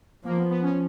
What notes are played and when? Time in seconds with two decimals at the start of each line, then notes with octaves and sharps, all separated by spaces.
0.24 F3 A#3
0.37 B3
0.51 B3
0.62 C#4